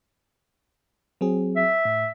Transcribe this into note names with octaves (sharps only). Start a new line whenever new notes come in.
F#3 C4 G#4
E5
A2